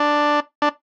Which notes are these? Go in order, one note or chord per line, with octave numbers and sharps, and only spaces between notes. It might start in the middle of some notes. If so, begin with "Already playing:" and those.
Already playing: D4
D4